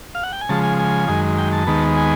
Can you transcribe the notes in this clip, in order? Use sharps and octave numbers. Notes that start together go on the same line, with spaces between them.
F5
F#5
G5
G#5
C#3 F3 G#3 A5
G#5
G#5
F#2 D#3 G#3
G5
A5
D#2 D#3 G#3 B3
G#5